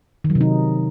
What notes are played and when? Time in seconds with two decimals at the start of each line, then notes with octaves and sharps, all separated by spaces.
0.24 D#3
0.30 F#3
0.35 C3
0.41 D#4